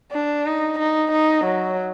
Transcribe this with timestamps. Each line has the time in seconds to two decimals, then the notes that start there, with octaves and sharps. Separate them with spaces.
0.13 D4
0.46 D#4
0.79 D#4
1.12 D#4
1.45 F#3